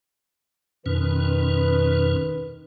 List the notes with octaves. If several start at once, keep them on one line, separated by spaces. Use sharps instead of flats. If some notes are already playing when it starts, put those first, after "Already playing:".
F2 B2 D#3 C#4 B4